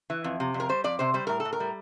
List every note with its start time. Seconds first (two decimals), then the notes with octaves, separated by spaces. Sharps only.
0.10 E3
0.24 F2
0.40 C3
0.54 F2
0.60 A#4
0.69 G3 C5
0.84 F2 D5
0.99 C3 C5
1.14 G3 C5
1.27 A2 A#4
1.40 A4
1.45 A2
1.53 A#4
1.60 G3